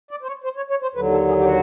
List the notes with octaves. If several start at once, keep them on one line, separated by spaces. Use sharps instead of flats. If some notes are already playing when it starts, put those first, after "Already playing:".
D5
C5
C#5
C5
C#5
C#5
C5
D#2 D3 F#3 B4
A4
G#4
G4
F#4